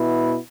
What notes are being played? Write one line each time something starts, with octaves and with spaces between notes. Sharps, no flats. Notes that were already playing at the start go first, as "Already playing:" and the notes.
Already playing: B2 B3 E4